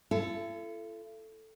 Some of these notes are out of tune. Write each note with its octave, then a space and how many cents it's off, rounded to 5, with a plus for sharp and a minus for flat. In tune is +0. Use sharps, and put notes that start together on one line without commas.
E4 +45 A4 +0